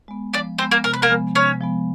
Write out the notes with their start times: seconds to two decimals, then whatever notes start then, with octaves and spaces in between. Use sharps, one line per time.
0.08 G#3 B3
0.34 F3 D4 D5
0.58 G#3 B3 C4 C5
0.71 A#3 A#4
0.84 C3 A#4
0.94 B4
1.02 A#3 A#4
1.10 F3 G#3 B3
1.35 C3 C#4 C#5
1.60 F3 G#3 B3